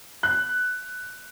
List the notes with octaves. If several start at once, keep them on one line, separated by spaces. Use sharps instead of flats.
F#6